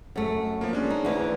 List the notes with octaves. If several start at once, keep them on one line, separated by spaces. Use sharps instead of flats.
F#2 A3
F3 A#3
G#3 C#4 D4
D#4
D2 E3